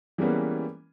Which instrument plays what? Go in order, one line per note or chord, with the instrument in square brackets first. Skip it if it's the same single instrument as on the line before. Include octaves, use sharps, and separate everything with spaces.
[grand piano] E3 G3 G#3 A#3 B3 C#4